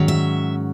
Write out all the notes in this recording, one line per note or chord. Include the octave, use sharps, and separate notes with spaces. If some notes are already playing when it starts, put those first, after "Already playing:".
Already playing: G#2 D#3 F#3 C#4
E5